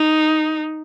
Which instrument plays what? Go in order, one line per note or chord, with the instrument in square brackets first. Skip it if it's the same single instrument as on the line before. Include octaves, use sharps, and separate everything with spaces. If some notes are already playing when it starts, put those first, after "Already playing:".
Already playing: [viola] D#4